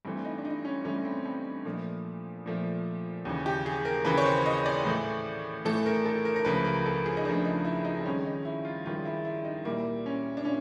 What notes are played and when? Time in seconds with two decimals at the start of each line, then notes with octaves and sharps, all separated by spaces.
0.05 G2 E3 A3 C4
0.25 D#4
0.38 D4
0.45 D#4
0.65 C#4
0.85 G2 E3 A3 C#4
1.05 C4
1.25 C4
1.65 A#2 F3 A3
2.46 A#2 F3 A3
3.25 D#2 C#3 E3
3.46 G4
3.66 G#4
3.85 A#4
4.05 D#2 C#3 E3 B4
4.17 C#5
4.26 C5
4.46 D#5
4.66 D5
4.85 A2 E3 A3
5.65 A2 E3 A3 A4
5.86 A#4
6.06 A4
6.25 A#4
6.36 A#4
6.45 C#2 C#3 F3 A3 B4
6.65 A#4
6.86 A4
7.06 G#4
7.17 D#4
7.25 C#2 C#3 F3 A3 D4
7.45 D#4
7.65 E4
7.85 D#4
8.00 C4
8.05 G2 D#3 G#3 C#4
8.25 D#4
8.45 E4
8.65 F4
8.86 G2 D#3 G#3 F4
9.05 E4
9.25 E4
9.45 D#4
9.65 A#2 G3 A#3 E4
10.06 C#4
10.37 D4
10.45 A#2 C#4